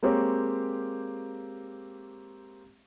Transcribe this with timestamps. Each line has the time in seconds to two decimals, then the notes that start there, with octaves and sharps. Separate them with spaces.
0.03 G#3 A#3 C4 G4 C#5